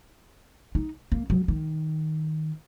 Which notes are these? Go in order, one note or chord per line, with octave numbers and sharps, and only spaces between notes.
D#4
A#3
F#3
D#3